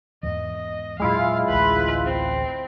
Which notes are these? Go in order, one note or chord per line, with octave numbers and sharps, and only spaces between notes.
E2 G#2 E3 D#5
A#2 F#3 G#3 E4 F4 F5
A1 D2 B4
C4